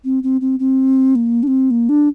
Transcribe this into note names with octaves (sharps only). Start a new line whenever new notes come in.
C4
C4
C4
C4
A#3
D4
C4
A#3
D4